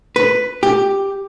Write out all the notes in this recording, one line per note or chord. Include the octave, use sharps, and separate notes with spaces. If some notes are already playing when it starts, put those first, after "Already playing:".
B4
G4